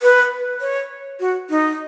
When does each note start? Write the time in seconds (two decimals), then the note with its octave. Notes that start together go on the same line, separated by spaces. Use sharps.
0.02 B4
0.61 C#5
1.20 F#4
1.50 D#4